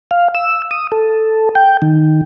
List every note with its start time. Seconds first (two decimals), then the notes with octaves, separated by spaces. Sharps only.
0.11 F5
0.35 E6
0.71 D#6
0.92 A4
1.55 G5
1.82 D#3